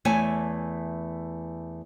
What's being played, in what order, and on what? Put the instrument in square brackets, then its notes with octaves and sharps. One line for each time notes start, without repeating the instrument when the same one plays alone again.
[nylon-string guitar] E2 E3 A3 C#5 G#5 A5